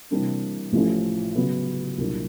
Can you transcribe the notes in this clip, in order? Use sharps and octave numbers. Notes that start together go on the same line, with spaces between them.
C3 E3 G3 A#3 D4
A1 A2 F3 A3 C#4
C#3 F#3 B3
C2 A#2 F#3 A#3 D4